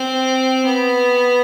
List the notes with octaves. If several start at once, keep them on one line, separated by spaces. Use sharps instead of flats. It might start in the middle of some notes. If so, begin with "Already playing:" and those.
Already playing: C4
B3